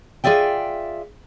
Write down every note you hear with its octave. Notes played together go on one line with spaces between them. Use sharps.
F4 G#4 D5 E5 G5